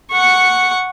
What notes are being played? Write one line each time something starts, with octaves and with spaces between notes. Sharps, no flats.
F#5 C#6